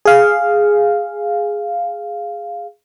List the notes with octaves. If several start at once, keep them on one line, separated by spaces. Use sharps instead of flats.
G#4 F5